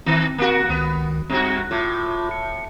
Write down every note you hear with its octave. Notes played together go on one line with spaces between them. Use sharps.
D#3 C4
A#3 F#4
C#2 D#3 B3
G2 C4 F#4
A2 F4 D6
C#7